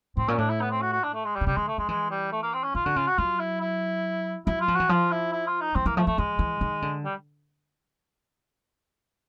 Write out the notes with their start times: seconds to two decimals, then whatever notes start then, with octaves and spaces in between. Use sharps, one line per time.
0.17 A2 C4
0.28 A#2 C#4
0.38 A2 D4
0.49 E4
0.61 B3
0.71 C4
0.82 F#4
0.92 F#4
1.03 D4
1.14 A3
1.25 G#3
1.35 G3
1.41 D3
1.46 C#3 G3
1.57 D3 G#3
1.67 A3
1.78 F3 G#3
1.89 E3 G#3
2.11 G3
2.32 A3
2.43 A#3
2.53 C4
2.64 C#4
2.75 D#3 F4
2.86 D3 F#4
2.96 C#3 F4
3.07 F#4
3.18 F#3 F4
3.39 E4
3.61 E4
4.46 F#3 E4
4.61 F4
4.68 F3
4.75 E3 F#4
4.89 F3 F4
5.11 E4
5.32 E4
5.46 F4
5.61 D#4
5.75 E3 C4
5.86 E3 A#3
5.96 F3 A3
6.07 F3 A3
6.18 F3 G#3
6.39 E3
6.61 D#3
6.82 D3
7.04 G3